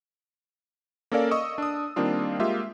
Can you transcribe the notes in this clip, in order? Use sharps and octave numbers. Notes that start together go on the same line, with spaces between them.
A#3 C#4 A4 A#4 D5 F5
D#5 C#6 D#6 E6
D4 D#6
D#3 G3 A#3 C4 D4 F4
G#3 A#3 F4 G4 E5